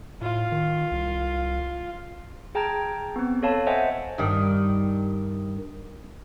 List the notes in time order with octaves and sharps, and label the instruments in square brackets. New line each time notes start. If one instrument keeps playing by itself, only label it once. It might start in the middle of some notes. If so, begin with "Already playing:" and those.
[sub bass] A2 [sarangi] F4
[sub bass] D#3
C2
[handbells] G#4 G5 A5 A#5 F6 G#6
B3 C4
A4 C#5 F5 A5 B5
C5 D#5 E5 F#5 G#5 A5
[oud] G2 D#3